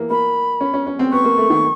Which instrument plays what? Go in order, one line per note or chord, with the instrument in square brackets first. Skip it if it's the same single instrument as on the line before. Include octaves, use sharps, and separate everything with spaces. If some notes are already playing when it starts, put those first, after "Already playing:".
Already playing: [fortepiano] E3 A#3
[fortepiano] A#3 [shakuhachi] B5
[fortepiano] C#4
C#4
C#4
C4
[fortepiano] B3 [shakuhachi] C#6
[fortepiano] A#3
A3
D#3